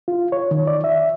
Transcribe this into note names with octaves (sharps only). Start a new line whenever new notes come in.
F4
C#5
D#3
D5
E5